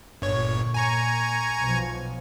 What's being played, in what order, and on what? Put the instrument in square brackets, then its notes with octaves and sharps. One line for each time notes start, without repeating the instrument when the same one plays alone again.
[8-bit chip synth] G1 C#5 [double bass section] A#2
[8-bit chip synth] G#5 A#5 C#6
[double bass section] B1 B2 F3